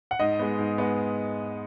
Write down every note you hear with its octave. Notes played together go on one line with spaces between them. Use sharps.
F#5
G#2 D#5
G#3 B3
G#2
G#3 B3